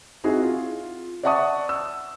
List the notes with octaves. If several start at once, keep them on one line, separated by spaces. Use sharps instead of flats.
C4 D#4 E4 F#4 G#4
F4
D5 E5 F#5 A5 C#6 D#6
E6